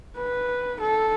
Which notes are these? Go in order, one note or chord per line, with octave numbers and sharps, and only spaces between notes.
B4
A4